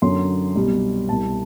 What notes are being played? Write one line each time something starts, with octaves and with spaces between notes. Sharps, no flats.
F#2 D3 F#3 C6
C2 B2 G3
C2 B2 G3 A5